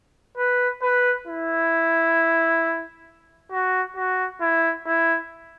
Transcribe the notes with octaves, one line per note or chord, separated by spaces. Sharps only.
B4
B4
E4
F#4
F#4
E4
E4